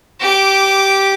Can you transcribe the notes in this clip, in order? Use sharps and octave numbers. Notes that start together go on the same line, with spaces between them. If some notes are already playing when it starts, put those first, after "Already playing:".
G4 D6